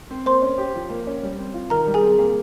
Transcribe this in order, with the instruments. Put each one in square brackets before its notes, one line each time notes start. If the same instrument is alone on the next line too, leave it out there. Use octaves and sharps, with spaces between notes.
[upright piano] C4
[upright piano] A#3 [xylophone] C5 C6
[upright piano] C#4
G4
F3
A#3
C#4
G3
C4
F4
[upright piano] D#3 [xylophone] A#4 A#5
[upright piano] G3
[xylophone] G#4 G#5
[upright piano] C4
A#3